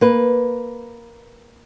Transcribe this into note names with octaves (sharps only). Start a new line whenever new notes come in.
A#3 B4